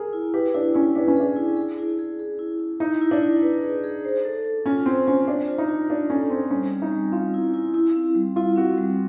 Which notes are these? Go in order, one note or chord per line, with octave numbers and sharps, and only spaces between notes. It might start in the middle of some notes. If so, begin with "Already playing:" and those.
Already playing: G#4 A#4
E4
G4 B4
D4 E4
C#4 E4
D4 B4
C#4
D4 G#4
E4
G#4
E4
G#4
G#4
E4
E4
D#4 E4
E4
D4
E4
B4
G#4
G#4
C5
A4
A4
C#4 F4
C4 C5
C#4 F4
D4 C5
F4
D#4
F4
D4 F4
C#4 A4
C4 C5
G3 C#4
C4
D#4
G3
C4 F4
E4
E4
E4
C4
G3
E4 F4
C4 F#4
G3